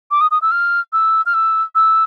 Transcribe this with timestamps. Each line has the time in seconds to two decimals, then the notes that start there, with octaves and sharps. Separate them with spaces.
0.11 D6
0.21 D#6
0.31 D#6
0.42 E6
0.51 F6
0.93 E6
1.26 F6
1.34 E6
1.75 E6